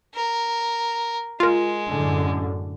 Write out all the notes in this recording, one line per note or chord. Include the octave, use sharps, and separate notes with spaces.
A#4
G#3 F4 A#4
F#2 A2 D3